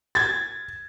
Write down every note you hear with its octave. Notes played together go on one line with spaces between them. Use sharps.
G#6 A6